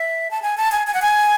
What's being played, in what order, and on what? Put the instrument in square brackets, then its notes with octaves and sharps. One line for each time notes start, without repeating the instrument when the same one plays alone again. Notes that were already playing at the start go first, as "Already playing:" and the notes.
Already playing: [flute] E5
A5
G#5
A5
G#5
G#5
F#5
G#5